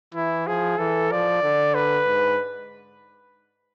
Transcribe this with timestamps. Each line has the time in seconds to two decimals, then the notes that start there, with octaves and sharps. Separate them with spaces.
0.14 E3 E4
0.46 F3 G#4
0.78 E3 A4
1.11 F3 D5
1.43 D3
1.75 B4
2.07 G#2